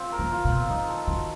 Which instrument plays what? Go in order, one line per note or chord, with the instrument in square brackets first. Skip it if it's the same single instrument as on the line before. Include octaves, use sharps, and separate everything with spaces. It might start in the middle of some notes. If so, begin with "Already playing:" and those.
Already playing: [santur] C4 F4
A#4
[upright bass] D#3
[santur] F4
[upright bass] B2
[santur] C4
[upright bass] D#3 [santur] D#4
[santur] A4
[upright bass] D#3 [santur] F#4